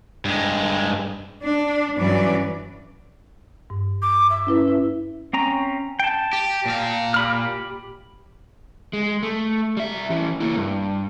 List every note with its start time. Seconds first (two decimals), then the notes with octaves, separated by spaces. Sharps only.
0.25 G2 G#3
1.43 D4
1.97 G2 E3 F#3 C#4 B4 D5
3.70 G2
4.02 D6
4.30 E5
4.47 C#4 E4 B4
4.66 C#4 E4
5.33 C4 C#4 A#5
6.00 G5 A5
6.33 G4
6.66 A#2 F5
7.14 G4 B5 F6
8.93 G#3
9.23 A3
9.77 G3 E5
10.11 E3 C#4
10.40 A#3 E4
10.56 G2